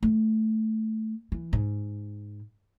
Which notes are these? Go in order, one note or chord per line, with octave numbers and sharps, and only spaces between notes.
A3
E3
G#2